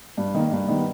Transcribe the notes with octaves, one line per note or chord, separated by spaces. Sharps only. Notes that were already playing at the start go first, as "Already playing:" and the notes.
G2
D#3 A#3
G2
D#3 G3 B3